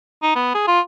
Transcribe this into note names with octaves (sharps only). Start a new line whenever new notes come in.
D#4
B3
G#4
F4